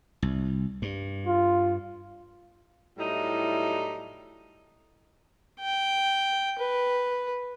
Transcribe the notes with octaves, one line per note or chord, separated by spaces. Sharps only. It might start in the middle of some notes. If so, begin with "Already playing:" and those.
C2
G2
F4
A2 F#3 G3 D#4 E4
G5
B4